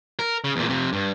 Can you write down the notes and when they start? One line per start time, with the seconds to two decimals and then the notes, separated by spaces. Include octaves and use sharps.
0.19 A#4
0.44 C#3
0.56 E2 A#2
0.69 F2 C3
0.93 G2